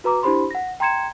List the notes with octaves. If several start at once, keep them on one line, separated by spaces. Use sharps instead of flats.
F#4 B4 A#5 D6
D4 E4 G4 C5 B5 C6
F#5 A#6
G5 A#5 C6 G#6 C#7 E7